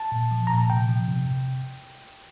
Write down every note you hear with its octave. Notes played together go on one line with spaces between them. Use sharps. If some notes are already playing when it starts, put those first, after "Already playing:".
Already playing: A5
A#2
F3
A#2 A#5
A5
C3 G5
F3
C3
C3